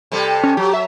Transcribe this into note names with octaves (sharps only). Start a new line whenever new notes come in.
C3 G3 A4
C#4
F#3 G4
E5